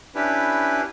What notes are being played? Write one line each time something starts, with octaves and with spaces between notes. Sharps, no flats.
C#4 D4 E4 G4 B4